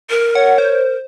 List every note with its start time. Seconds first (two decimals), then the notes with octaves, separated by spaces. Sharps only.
0.10 A#4
0.35 C#5 F#5
0.58 C5